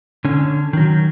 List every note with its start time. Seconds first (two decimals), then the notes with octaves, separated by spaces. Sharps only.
0.25 D3 C#4
0.73 D#3 F#3